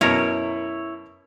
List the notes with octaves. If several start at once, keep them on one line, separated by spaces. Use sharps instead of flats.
F#2 B2 C#4 E4 A#4 C#5